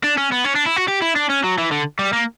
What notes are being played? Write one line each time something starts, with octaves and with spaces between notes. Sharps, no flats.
D4
C#4
B3
C#4
D4
E4
F#4
G4
E4
D4
C#4
F#3
E3
D3
G3
A#3